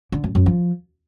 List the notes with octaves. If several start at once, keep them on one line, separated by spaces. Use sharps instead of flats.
D3
F#2
F#2
F3